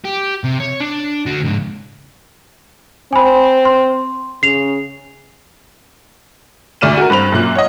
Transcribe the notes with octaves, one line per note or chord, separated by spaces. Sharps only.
G4
C3
C#5
D4
D3 F#4
C#2 G#2
C4 G#5 B5
C6
C#3 C7 F7
D2 A3 D5 F6 D#7 E7
F#4 A#4
G2 C4 B5 F7
F#2 A#2 F#6
C#5 D#5